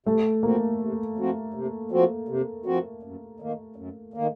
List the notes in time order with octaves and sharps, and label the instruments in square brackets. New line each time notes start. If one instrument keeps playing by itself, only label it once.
[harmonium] C3 [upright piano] A3
[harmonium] F3 C4 F#4 [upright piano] A#3
[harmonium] C3
F3 C4 F#4
C3
F3 C4 F#4
C3
F3 C4 F#4
F#2
D#3 A#3
F#2
D#3 A#3